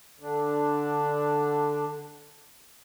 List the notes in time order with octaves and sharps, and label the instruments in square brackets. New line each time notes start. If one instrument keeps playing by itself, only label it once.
[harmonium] D3 D4